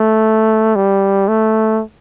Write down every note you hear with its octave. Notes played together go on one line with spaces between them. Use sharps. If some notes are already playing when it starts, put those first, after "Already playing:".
Already playing: A3
G3
A3